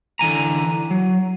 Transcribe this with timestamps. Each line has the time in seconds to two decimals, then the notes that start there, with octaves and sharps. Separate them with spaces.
0.19 D3 E3 G#5 A#5
0.91 F#3